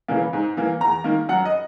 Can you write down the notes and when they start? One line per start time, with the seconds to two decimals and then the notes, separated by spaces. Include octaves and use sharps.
0.08 C#3 E3 A#3
0.33 G#2
0.57 E3 A#3
0.80 E2 A#5
1.04 D#3 A#3
1.29 F#2 F#5
1.45 D#5